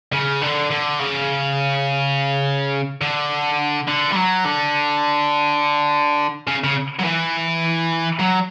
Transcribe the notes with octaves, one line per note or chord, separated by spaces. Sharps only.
C#3
D3
D3
C#3
D3
D3
G3
F#3
D3
C#3
C#3
F#3
E3
F#3